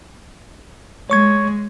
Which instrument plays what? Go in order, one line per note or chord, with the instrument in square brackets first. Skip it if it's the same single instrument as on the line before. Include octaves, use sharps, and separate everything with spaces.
[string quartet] G#3 [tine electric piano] C#5 C#6 G#6